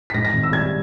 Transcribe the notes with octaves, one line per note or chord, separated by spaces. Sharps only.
B6
G#2 A#6
A#6
G#1
E6
G3 G#6